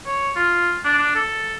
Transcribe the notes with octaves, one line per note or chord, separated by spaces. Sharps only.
C#5
F4
D4
D4
A4